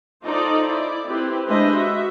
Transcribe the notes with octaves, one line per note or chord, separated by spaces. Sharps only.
D#4 F4 A4 C5 D5 D#5
E4 D5
C4 E4 G4 B4
G#3 D4 B4 C5 D#5 E5
F#4 E5